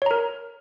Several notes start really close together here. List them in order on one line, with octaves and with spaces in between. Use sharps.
C#5 A#5 A#4